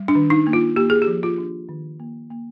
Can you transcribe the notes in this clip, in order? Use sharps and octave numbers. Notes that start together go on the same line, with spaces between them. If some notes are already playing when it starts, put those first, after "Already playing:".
Already playing: G3
D4
D#3
D#4
A#3
F4
A#3 G4
G#4
G4
F3
F4
D4
D#3
A#3
A#3